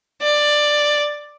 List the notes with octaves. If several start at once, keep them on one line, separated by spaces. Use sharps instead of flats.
D5